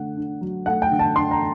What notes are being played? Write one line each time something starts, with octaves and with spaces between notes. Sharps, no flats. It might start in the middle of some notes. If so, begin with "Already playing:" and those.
Already playing: D3 A3 F#5
D4
F#3
A3 F#5
G5
D3
A5
D4 C6
A#5